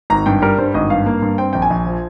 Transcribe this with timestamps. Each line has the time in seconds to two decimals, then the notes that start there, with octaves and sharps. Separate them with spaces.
0.10 G#1 A#5
0.26 G2 G5
0.42 G3 A#4
0.58 G2 C5
0.74 G#1 D#5
0.90 G2 F5
1.06 A#3
1.22 G2
1.38 C4 G5
1.53 A#1 G5
1.62 G#5
1.70 A#1
1.86 F3